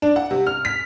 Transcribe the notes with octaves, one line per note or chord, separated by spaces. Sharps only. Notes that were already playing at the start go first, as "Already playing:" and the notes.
D4
F#5
C3
F6
B6